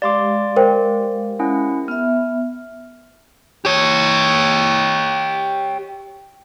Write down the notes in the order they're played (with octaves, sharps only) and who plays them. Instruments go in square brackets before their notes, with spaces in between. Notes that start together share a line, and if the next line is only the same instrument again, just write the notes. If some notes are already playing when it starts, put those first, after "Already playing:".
[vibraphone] G#3 G4 F5 [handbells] D5 C6 D6
[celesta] A#4 C5 G5
[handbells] C#4 E4 F#5
[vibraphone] B3 E5 [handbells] F6
[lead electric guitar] G4 C#5